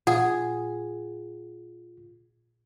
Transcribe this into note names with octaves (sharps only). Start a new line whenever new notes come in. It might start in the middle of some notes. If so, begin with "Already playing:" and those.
A#2 F4 G#4 F#5